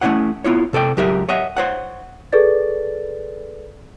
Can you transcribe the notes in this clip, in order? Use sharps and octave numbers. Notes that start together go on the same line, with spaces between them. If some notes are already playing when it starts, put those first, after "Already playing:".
A3 C#4 D4 E4 C#5 F#5
B3 E4 F4 C#5
C3 A4 D5 G5
C#2 F#3 G4 A#4 E5
C#5 D#5 E5 F#5
C5 C#5 F#5
G#4 A4 B4 D5 A6